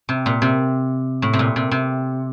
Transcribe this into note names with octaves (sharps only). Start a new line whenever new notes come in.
C3
A#2
C3
A2
C3
A#2
C3
C3